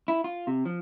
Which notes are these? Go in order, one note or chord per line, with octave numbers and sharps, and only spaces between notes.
E4
F4
C3
F3